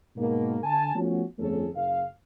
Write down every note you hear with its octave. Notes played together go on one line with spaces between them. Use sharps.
G#2 B2 A#3
D3 G#5 A5
F3 A3 B3 C#4 F#4
G1 F2 A3 C#4 G#4 A4
F#1 F5